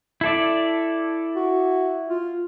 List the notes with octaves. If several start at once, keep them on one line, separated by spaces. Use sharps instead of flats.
E4 A4 D5
F#4
F4